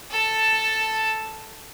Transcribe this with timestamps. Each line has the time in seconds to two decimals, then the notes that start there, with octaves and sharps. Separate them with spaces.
0.11 A4 A5